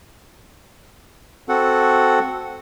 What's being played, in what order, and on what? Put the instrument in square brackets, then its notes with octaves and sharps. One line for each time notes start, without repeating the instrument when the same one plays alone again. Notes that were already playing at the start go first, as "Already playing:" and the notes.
[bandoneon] C4 F#4 A4 F#5